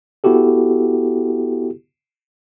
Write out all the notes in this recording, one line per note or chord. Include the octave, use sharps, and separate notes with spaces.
B3 E4 F#4 G4 A4